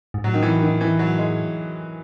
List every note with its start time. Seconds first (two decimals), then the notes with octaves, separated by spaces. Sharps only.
0.14 G#2
0.24 A2 F#3
0.34 D#3
0.42 E3
0.62 D#3
0.81 E3
0.99 F#3
1.18 G#3